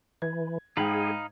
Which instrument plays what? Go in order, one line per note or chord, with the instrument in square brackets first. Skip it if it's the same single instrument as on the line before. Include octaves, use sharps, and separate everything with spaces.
[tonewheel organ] E3 [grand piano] G#6
[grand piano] G#2 G5 [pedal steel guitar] D#4 F5 B5 [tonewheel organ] G#4